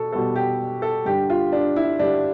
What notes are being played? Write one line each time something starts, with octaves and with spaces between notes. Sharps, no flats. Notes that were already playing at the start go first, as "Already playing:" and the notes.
Already playing: B2 A4
B2 G3 B3 A4
G4
A4
G2 D3 G3 G4
F4
D4
E4
G2 D3 G3 D4